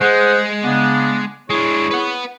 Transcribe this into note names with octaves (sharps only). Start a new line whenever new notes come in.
G#3 G#4 C5 F#5
C#3 B3 D4
G#3 D4 E4 G#4 C#5
B4 F#5